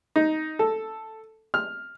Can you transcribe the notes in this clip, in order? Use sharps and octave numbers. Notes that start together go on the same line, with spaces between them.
D#4
A4
F6